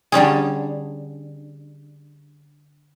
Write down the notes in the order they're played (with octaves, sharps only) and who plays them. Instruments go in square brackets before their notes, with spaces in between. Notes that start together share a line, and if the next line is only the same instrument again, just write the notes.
[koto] D3 G3 C#4 G#4